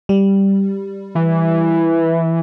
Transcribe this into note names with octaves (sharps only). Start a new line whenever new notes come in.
G3
E3